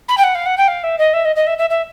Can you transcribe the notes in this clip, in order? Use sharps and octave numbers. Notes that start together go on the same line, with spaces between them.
B5
G5
F#5
F5
F#5
G5
F5
E5
D#5
E5
D#5
D#5
E5
E5
E5